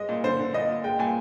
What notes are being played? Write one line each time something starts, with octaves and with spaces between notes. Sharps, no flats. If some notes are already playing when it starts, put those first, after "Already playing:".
Already playing: G#3 D#5
A#2
D3 C5
D3
A#2 D#5
A#2
G#3 G5
A#2 G#5